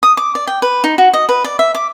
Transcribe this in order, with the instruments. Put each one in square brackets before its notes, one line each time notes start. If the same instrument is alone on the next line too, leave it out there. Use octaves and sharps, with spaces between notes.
[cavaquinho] D#6
D6
D5
G5
B4
D#4
F#4
D#5
B4
D5
E5
D6